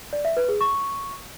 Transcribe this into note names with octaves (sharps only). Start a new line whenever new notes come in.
D5
E5
B4
G#4
C#6